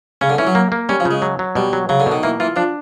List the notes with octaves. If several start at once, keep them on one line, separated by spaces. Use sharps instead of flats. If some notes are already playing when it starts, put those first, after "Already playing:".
C#3 C#4
D3
E3 C#4
F#3
A#3
A#3
G3 C#4
F3
C#3
G#3
F#3
F#3
B2 G3
F#3
C#3 F#3
D3
B2
D#3
E3 A#3
E3 F4
F3 D4